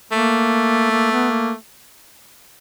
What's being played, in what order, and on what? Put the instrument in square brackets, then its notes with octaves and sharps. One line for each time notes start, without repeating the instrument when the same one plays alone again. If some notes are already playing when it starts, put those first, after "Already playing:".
[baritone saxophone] A3 [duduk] A#3
[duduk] A#3
B3
A#3